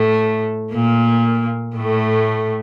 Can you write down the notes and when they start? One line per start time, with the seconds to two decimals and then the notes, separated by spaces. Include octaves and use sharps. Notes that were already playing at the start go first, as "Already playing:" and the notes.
Already playing: A2 A3
0.73 A#2 A#3
1.76 A2 A3